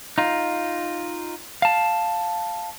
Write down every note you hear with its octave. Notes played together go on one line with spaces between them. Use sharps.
D#4 F4
F5 A5